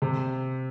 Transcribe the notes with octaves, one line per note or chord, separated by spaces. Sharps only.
C3